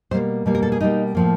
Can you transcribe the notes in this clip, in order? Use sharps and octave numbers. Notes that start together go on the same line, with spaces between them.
B2 G3 A#3 C5
B2 G3 A#3
A#4
A4
G#4
B2 G3 A#3 D#4
A2 F3 A#3